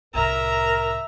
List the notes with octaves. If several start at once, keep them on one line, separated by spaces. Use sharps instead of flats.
C2 A2 A#4 E5 A#5